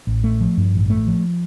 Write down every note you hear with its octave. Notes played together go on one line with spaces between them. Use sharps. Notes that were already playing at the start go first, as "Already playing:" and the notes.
A1
A3
F3
G2
A1
A3
F3